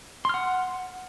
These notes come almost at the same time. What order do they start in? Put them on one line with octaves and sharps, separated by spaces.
C6 F6 F#5